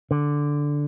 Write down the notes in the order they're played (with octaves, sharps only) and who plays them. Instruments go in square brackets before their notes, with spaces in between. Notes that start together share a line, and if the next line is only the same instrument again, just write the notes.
[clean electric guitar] D3